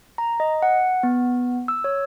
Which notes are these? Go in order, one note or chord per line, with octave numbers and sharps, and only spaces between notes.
A#5
D#5
F#5
B3
E6
C#5